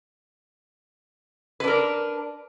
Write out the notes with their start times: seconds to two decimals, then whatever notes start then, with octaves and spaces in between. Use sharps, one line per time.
1.60 B4
1.64 D4
1.67 A#4